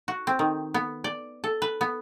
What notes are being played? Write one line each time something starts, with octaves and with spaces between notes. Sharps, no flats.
F#4
C4
D#3
B3
D5
A4
B4
B3